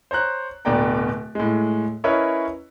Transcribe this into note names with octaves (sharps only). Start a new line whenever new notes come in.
C5 C#5 A#5 F#6
D1 B2 D3 D5 G5 A#5
A2 G#3
C#4 E4 A#4 B4 C#5 D#5